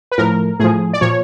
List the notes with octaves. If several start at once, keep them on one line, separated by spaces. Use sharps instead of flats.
B4
A2 F3 A#4
A2 F3 G#4
D5
A#2 F3 C#5